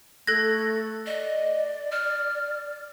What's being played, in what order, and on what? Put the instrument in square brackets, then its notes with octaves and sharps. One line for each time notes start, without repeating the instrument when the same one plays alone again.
[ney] A3 [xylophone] A4 G#6 [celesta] F#6 A#6
[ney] D5 [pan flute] D#5
[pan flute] F6